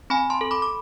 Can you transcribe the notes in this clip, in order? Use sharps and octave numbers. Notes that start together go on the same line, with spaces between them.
C4 G#5 B5
A5 C6
A4
B5 D6
D6